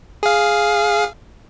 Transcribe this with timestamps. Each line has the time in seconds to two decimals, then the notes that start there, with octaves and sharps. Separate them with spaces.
0.23 G#4 F5